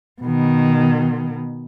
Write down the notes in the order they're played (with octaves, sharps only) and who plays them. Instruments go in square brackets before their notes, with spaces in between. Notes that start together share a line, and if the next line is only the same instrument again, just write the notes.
[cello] B2 D#3